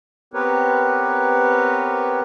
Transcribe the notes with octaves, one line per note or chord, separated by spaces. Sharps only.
B3 C4 G4 A#4 B4 C#5